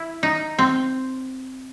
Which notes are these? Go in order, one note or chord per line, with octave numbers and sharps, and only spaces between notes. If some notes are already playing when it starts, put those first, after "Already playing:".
Already playing: E4
D#4
C4